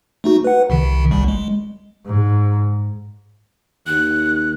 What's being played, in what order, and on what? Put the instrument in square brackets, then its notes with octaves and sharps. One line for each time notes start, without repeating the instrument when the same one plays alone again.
[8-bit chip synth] A3 D#4 F#4
B4 F#5
C2 C3 D#3
G1 C2 G3
G#3
[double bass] G#2
[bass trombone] D#2 [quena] F#6